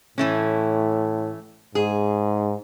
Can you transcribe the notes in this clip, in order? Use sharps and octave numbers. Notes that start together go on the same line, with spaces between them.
A2 E3 A3 C#4
G#2 G#4